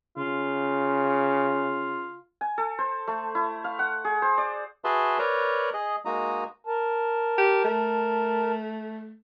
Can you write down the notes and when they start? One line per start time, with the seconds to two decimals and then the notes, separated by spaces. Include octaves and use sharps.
0.17 C#3 F4
2.41 G#5
2.58 A4
2.79 C5
3.07 A3
3.35 E4
3.64 F5
3.79 F#5
4.04 G#4
4.22 C5
4.38 D5
4.84 F#4 G#4 B4 E5 A5 C6
5.19 A#4 B4 C#5 D5 A#5
5.74 G#4 D#5
6.05 G#3 A#3 D#4 F#4 A#5 D#6
6.67 A#4 A5
7.38 G4
7.64 A3